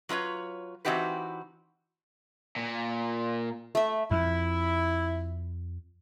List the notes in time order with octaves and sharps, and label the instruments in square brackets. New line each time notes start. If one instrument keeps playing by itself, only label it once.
[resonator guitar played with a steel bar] F#3 F4 B4 C#5
E3 C4 D#4 F#4 G4 B4
[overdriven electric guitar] A#2
[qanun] A3 E5
[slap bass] F2 [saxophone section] E4